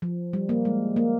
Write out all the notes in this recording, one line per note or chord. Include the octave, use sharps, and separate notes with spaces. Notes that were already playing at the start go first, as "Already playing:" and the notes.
F3
G3
A#3
G#3
A#3